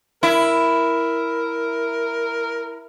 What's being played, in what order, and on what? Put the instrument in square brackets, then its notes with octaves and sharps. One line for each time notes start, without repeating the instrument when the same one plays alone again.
[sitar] E4 [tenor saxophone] A#4